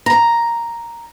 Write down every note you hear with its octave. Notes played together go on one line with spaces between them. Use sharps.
A#5